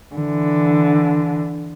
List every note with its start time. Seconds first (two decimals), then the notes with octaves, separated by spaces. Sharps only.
0.16 D3 E3